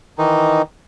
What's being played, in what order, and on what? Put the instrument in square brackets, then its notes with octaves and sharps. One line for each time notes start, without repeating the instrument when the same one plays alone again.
[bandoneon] D#3 E3 D#4